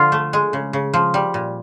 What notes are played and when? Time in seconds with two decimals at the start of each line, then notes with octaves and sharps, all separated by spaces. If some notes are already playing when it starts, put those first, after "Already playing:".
Already playing: D3 F3 F4
0.12 A3
0.33 G#3
0.53 C#3
0.73 C#3
0.94 F3
1.14 G3
1.34 A#2